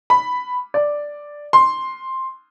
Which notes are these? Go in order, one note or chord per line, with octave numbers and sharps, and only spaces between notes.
B5
D5
C6